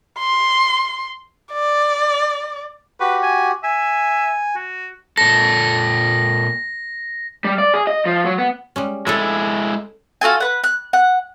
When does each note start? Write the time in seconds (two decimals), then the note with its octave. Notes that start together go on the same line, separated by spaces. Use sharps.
0.19 C6
1.53 D5
3.00 F#4 G4 B4
3.23 G#5
3.64 E5 G#5
4.56 F#4
5.17 A#2 A4 A#6
7.44 G3
7.58 D5
7.74 G#4
7.87 D#5
8.06 F3
8.25 F#3
8.38 B3
8.76 G3 G#3 C#4
9.07 G#3 E4 A4 D#5 E5
10.21 F4 F#4 A4 G#5
10.40 B4 F#5
10.64 F#6
10.93 F#5